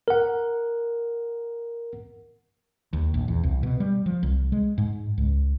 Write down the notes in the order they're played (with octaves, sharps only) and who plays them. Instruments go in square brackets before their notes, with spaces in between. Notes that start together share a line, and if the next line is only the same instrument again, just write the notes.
[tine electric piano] A#4 F#5
[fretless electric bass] D#2
A#1
E2
C2
B2
G3
F3
C2
G#3
G#2
C#2